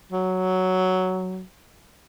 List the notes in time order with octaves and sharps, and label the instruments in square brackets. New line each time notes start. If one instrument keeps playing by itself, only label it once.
[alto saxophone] F#3